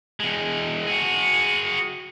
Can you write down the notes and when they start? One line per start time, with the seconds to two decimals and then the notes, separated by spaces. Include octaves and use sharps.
0.20 E2 G#3
0.87 F#4 G#4